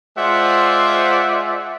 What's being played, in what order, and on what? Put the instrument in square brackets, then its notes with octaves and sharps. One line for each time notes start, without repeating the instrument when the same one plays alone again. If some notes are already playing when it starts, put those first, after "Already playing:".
[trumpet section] G#3 F4 C5 D5 E5 F#5